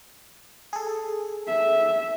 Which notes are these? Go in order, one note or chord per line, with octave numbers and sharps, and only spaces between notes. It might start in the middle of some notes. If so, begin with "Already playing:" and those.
G#4 A4
E5